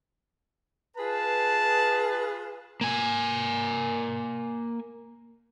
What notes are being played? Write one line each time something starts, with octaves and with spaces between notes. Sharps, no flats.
F4 G#4 B4 A5
A#3 G#5